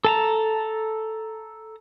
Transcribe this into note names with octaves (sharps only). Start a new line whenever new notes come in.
A4 A5 A#5